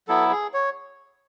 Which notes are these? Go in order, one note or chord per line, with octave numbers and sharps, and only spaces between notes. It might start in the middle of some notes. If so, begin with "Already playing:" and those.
F#3 B3 E4 A4
G#4
C#5